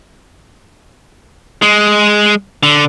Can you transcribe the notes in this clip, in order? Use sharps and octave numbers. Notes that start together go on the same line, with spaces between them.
G#3
D3